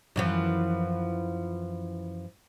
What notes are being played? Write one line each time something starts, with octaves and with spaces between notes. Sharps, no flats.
F#2 E3 F3